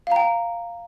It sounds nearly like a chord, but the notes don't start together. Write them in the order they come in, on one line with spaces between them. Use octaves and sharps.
F5 A#5 G5